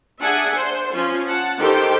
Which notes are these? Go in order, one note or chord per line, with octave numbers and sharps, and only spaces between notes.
D4 G#4 E5 F#5 G#5
C5
F3 C#4 F4
F#5 A5
D#3 G4 A4 C5 G5